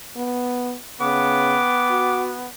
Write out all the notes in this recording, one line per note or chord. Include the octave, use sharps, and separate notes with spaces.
B3
C#3 B3 G5 D6
F#4